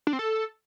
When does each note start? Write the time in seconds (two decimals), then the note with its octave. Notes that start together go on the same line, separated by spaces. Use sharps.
0.07 D4
0.13 C4
0.19 A4